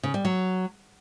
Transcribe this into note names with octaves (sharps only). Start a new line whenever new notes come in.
C#3
G3
F#3